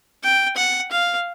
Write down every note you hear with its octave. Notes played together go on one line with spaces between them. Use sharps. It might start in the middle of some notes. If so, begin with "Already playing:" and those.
G5
F#5
F5